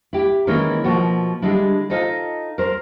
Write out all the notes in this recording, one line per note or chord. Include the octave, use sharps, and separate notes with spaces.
E4 G4
D#3 E3 G#3 A#3 C#4 E4
B2 F3 A#3 F#4
D3 G3 G#3 D4 E4
D#4 F4 A4 C5 D#5
A#4 C5